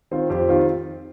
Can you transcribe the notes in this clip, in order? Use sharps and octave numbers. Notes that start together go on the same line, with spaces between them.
D#3 C4 F4
F2 G4 C5
D#3 C4 F4